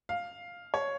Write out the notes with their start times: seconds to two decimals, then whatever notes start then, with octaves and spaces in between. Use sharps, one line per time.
0.09 F5
0.74 C#5